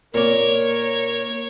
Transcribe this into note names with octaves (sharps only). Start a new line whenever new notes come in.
A#2 A#3 A#4 C#5